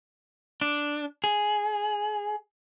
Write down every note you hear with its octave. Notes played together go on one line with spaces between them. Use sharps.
D4
G#4